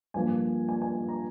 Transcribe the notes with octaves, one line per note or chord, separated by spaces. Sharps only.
G2 F3 A#3 G#5
G#5
G#5
A#5